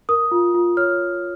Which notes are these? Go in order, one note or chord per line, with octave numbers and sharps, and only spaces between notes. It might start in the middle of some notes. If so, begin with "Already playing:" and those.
A#4 D#6
F4
F4
C#5 F6